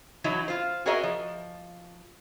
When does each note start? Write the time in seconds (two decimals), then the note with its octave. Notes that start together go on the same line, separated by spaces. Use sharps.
0.24 E3 F#3 D#4 E4 F#4
0.48 F4 C5
0.86 F#4 G#4 A#4 C#5 D#5 E5
1.03 F3